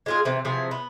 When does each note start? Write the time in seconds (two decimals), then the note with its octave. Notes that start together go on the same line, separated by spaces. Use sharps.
0.06 G#3 F4 G#4
0.25 C3 E3
0.45 C3 E3 F3 G#4
0.71 B3